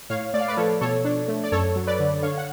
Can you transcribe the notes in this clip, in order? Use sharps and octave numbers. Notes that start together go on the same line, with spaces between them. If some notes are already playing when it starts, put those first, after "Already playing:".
A2 C#5 F5
A3 D5
F5
B4 D5
F3 A4 C#5
B2 A4 C#5
D4
A3
D5
F#2 A4 C#5
F#3
B4 D5
D3
D3 C#5 F5
F#5